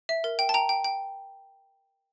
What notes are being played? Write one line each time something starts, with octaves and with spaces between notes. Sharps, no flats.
E5
A#4
G5
A5
G5 A#5
G5
G5